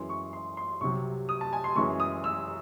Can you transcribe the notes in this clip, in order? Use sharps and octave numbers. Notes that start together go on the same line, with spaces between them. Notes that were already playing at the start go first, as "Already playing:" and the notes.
Already playing: F#2 E3 G#3 C6
C#6
C6
C6
C2 C3 F#3 C#6
D#6
A5
G#5
C6
F#2 E3 G#3 C#6
D#6
E6